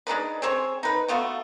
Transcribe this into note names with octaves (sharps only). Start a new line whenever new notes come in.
G#3 D4 D#4 B4
C4 G#4 C5 C#5
D#4 B4
A3 B3 F4 F#4